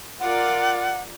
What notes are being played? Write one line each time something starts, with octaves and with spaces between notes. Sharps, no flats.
F4 A#4 D5 F#5